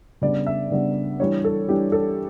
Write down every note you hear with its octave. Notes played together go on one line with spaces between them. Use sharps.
C#3 G3 B3 D4 D5
E5
C#3 G3 B3 D4 D5
E3 G3 D4 C#5
A4
E3 G3 D4 G4
A4